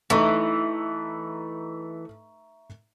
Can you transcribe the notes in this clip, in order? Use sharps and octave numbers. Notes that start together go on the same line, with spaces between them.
E3 A3 D#4 E5 A#5 C#6